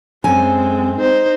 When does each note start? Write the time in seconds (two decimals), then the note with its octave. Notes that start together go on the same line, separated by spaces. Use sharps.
0.24 F#2 G#3 C4 A4 G#5
0.99 D#4 C5